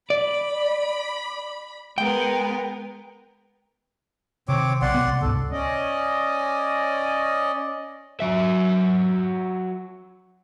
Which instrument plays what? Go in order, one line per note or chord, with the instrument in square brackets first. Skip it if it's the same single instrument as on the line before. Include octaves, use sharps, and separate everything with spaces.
[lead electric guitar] D5 [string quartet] B5
[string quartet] G#3 B3 A#4 [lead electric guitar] G5
[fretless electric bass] C3 D#3 [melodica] C4 C#5 D6
[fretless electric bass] B1 [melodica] D5 F#5 C6
[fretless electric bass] C3 B3
C2
[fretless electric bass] C#2 G#2 C3 [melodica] A4
[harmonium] C#4 D5 D#5
[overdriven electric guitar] F#3 E5